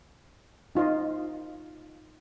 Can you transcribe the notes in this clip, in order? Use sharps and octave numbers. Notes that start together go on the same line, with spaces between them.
D#4 F4 C5 D#5